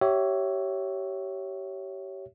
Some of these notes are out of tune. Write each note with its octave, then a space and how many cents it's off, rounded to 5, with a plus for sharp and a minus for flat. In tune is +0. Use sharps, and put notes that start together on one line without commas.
G4 -25 C#5 +0 E5 +0